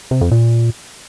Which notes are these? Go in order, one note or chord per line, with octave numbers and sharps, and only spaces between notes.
C3
F2
A#2